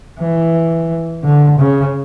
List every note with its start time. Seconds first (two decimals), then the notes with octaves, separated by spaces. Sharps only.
0.20 E3
1.24 D3
1.59 C#3